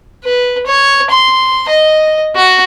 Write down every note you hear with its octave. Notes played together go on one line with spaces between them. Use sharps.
B4
C#5
C6
D#5
F#4